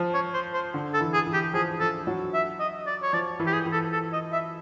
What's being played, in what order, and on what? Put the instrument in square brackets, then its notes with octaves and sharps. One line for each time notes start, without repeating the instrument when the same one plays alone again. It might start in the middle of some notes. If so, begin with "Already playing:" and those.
Already playing: [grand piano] F3
[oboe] C#5
C5
C5
[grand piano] D3
[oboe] A4
[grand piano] E3
[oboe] G#4
[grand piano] E3
[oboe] G4
[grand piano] F3 [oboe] G#4
[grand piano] F3 [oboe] A4
[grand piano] F#3
[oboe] E5
D#5
D5
C#5
[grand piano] F3 [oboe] D5
[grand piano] E3
[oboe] G4
G#4
[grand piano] E3
[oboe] A4
A4
D#5
E5